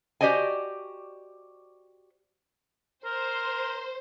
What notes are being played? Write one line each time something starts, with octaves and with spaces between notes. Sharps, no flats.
F#4 G4 C5 D5 D#5 G#5
A#4 C5